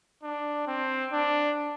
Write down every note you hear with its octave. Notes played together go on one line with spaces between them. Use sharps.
D4
C4
D4